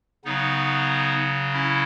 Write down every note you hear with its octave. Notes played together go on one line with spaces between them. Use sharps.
C#3 F#3 B3 D#4
C#4 E4